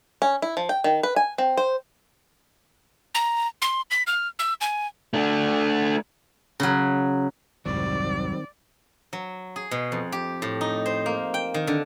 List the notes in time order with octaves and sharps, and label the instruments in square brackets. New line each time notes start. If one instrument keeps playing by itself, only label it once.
[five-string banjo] C#4
E4
F3
G5
D#3
B4
G#5
C4
C5
[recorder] A#5
C6
B6
F6
E6
G#5
[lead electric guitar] A3 D4
[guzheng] C#3 F#3
[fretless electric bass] F1 C2 G#2 [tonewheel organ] D#3 C4 [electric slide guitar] F#3 G3 [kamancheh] D5
[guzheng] F#3
G#4
B2
F2
G4
A2
D#4
C5
A#3
G5
D#3
D3